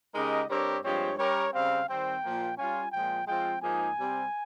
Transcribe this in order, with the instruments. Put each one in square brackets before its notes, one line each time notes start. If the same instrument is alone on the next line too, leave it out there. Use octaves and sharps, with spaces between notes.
[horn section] C#3 G#3 D#4 G4 A#4 [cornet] D#5
[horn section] G2 G3 C4 G4 A#4 [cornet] C#5
[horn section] G2 F3 G#3 C4 G4 [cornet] C#5
[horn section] G3 C#4 G4 A#4 [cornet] C#5
[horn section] C#3 G3 C4 [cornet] F5
[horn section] D#3 G3 C4 [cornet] G5
[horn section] A#2 F3 A#3
[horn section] G3 C#4 F4 [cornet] G#5
[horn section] A#2 F3 G#3 [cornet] G5
[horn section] F3 G#3 C4 F4 [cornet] G5
[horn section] G#2 F3 A#3 D#4 G#4 [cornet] G#5
[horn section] C3 G3 C4